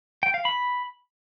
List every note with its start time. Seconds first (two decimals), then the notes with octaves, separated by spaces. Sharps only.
0.23 G5
0.34 F5
0.45 B5